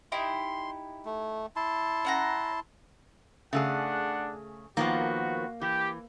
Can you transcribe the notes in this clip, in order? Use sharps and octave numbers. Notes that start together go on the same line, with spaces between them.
D#4 E4 G4 C6
A3
E4 A5 C6
C#4 F#5 A#5
C#3 A3 D4 G#4 F#5
D#3 F3 A#3 B3 F#4
E3 G4